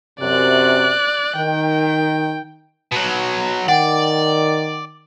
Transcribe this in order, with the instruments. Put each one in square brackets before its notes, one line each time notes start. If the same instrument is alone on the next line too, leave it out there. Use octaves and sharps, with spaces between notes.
[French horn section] F#2 C3 [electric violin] D5 F#6
[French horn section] D#3 [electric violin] G5
[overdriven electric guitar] B2 F#3
[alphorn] D#3 [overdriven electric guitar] D5 [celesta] F#5 G5